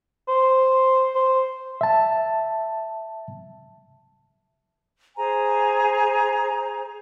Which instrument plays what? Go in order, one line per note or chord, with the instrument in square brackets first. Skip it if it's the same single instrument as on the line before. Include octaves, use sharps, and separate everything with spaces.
[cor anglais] C5
C5
[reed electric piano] E5 A5
[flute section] G#4 C5 G#5 A#5